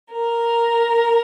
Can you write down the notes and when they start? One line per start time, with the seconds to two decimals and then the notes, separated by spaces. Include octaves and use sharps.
0.11 A#4